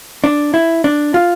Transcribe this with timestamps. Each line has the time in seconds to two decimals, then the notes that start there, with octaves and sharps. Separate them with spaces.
0.24 D4
0.54 E4
0.84 D4
1.14 F4